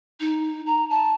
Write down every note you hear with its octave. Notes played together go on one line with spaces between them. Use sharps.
D#4
A#5
A5